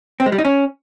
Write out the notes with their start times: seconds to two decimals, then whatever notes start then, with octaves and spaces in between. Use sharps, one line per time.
0.20 C4
0.26 G#3
0.32 G3
0.38 D#4
0.45 C#4